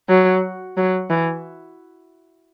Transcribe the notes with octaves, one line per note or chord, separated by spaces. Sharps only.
F#3
F#3
E3